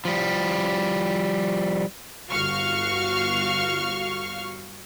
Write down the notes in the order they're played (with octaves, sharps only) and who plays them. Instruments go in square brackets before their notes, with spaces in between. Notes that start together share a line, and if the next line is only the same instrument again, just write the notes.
[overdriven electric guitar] F3 G3
[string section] G1 F#4 F5 C#6 F6